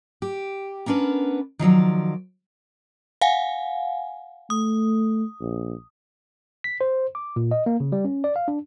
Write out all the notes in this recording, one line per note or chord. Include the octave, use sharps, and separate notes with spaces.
G4
B3 C#4 D4 A#4 B4
D#3 F3 F#3 D5
F5 F#5 G#5
A3 D#6
A#1
B6
C5
D6
A#2
D#5
A#3
C#3
G3
C#4
D5
F5
D4